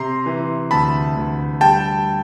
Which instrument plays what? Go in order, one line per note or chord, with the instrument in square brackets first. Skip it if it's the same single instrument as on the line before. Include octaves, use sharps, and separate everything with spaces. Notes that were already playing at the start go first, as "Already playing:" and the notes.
Already playing: [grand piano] C3 [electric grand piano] A#5 C6
[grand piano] E3
[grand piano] D2 [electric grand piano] A5 B5
[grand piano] D2
[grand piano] G3 [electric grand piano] G5 A5